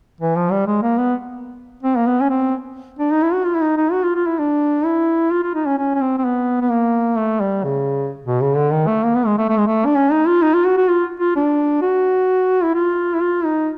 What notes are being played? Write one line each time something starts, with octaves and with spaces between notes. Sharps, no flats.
E3
F3
G3
G#3
A#3
B3
C4
A#3
B3
C#4
C4
D4
D#4
E4
F#4
F4
E4
D#4
D#4
F#4
F4
F4
E4
D4
E4
F4
F4
D#4
C#4
C#4
C#4
C4
C4
B3
B3
A#3
A3
G3
C#3
B2
C#3
D3
D#3
A3
A#3
B3
G#3
A3
A3
G#3
A3
D4
C#4
D#4
F4
D#4
F4
F#4
F#4
F4
F4
D4
F#4
E4
F4
E4
F4
D#4